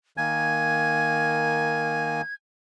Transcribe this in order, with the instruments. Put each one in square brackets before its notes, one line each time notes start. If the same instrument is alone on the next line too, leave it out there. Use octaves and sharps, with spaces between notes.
[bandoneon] D#3 A#3 G#5 [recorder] G#6